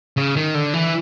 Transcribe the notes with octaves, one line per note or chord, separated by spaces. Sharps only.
C#3
D#3
D3
E3